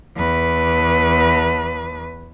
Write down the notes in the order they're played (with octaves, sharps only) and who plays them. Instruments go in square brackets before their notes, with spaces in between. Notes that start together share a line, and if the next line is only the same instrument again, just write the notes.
[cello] E2 B4